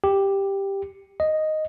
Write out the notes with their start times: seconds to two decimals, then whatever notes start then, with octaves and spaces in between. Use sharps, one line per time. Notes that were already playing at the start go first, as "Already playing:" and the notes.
0.04 G4
1.20 D#5